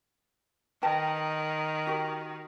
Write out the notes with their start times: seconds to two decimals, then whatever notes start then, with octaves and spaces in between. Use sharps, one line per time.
0.82 D#3 B4 G5 A5
1.87 F#4 G4 A#4